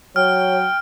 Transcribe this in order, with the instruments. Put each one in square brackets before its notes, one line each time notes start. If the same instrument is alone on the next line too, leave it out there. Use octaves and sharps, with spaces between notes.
[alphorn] F#3 [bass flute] C#5 [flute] G5 [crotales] F6